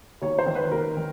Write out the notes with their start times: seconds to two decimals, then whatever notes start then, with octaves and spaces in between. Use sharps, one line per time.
0.22 D#2 C#5
0.39 C5
0.46 D#3
0.55 B4
0.71 D#2 A#4
0.97 D#3